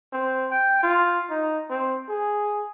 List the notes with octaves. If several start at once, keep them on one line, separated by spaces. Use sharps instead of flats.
C4
G5
F4
D#4
C4
G#4